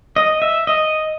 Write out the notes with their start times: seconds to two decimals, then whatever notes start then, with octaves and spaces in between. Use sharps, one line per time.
0.16 D#5
0.42 E5
0.67 D#5